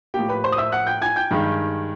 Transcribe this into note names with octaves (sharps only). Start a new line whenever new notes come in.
A2 F3 A#3 G4 G5
B4 B5
C5 C6
D#6
E5 E6
F#5 F#6
G5 G6
G#5 G#6
G5 G6
G2 D#3 G#3